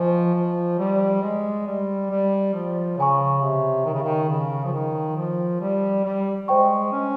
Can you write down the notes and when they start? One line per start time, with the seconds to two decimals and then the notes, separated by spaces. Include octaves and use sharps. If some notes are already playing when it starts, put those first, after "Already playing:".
Already playing: F3 C5 D#5 G#5 C#6
0.35 F3
0.79 G3
1.23 G#3
1.67 G3
2.10 G3
2.54 F3
2.97 C#3 C#5 G#5 C#6
3.42 C3
3.85 D#3
3.94 C#3
4.02 D#3
4.29 C#3
4.65 F3
4.73 D#3
5.16 F3
5.61 G3
6.04 G3
6.48 G#3 C5 G5 C#6
6.92 C#4